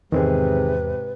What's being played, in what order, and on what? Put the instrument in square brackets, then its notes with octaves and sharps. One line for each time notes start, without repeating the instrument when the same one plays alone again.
[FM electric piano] E2 [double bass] G#2 C3 [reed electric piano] D#3 C4 G#4 [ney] B4